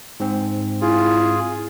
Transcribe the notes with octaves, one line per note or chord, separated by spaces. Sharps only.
G#2 C4
E4 F4 G#4